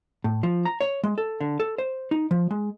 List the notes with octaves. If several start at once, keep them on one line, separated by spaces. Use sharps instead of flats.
A2
F3
A#5
C#5
G#3
A4
D3
A4
C5
D#4
F3
G#3